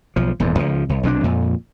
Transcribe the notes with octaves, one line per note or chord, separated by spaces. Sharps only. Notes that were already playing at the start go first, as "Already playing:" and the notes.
B1 F3
D#1 E2 G#2
C#2 F3
C2
B1 C3 E3 D4
F2 A#2